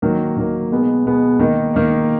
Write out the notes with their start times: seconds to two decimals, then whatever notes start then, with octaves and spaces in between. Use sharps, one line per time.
0.02 D#3 F#3 A#3
0.37 D#3 F#3 A#3
0.72 B2 G#3 B3
1.05 B2 G#3 B3
1.39 D#3 A#3 D#4
1.74 D#3 A#3 D#4